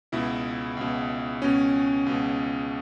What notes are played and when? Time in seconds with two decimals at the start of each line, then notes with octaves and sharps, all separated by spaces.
0.12 C#2 B2 E4
0.77 C#2 B2
1.42 C#2 B2 C#4
2.06 C#2 B2